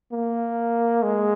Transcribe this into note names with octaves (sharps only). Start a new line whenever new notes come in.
A#3
G#3